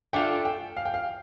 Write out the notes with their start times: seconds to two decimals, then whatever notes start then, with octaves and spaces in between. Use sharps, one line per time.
0.13 A3 D4 F4 A4 G5
0.45 G5
0.77 F5
0.85 G5
0.94 F5